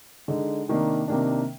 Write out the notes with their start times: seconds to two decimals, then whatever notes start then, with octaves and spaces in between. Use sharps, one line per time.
0.28 D3 G#3 D#4
0.68 C3 D#3 A#3 D4
1.08 C3 D#3 A#3 D4